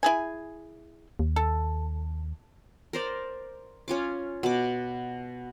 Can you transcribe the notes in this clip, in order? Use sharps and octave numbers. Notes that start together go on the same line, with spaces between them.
E4 G#4 G#5
D#2
A4
A#4 C5 D5
C#4 F4 D6
B2 D6